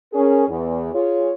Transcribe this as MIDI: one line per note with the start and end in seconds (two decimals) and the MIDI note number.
0.14 0.48 61
0.14 0.48 68
0.14 0.48 70
0.48 0.92 40
0.93 1.33 65
0.93 1.33 68
0.93 1.33 73